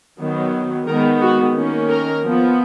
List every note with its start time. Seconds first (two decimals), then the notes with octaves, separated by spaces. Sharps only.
0.19 D#3 F#3 B3
0.87 D#3 G#3 B3 A#4
1.21 F#4
1.55 D#3 A#3 C#4
1.89 A#4
2.23 F3 B3